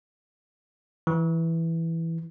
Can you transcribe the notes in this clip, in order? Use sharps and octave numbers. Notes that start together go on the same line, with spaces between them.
E3